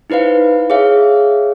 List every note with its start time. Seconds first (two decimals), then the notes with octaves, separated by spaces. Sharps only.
0.10 D#4 E4 B4 C5 F5
0.70 G#4 C#5 E5 F5